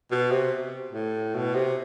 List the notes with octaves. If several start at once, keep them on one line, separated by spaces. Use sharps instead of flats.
B2
C3
A2
B2
C3